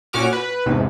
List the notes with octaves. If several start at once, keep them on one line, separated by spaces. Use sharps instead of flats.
A#2 C#4 F#4 D6 F6
B4
E2 G#2 C3